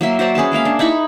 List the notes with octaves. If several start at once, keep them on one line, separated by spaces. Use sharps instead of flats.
F#3 A#3 E5 C6
F#4 C5 D5 A#5
C#4 G#4 B4 A5
G#3 A#3 E5 F5
D4
D#4 E4 B5 C#6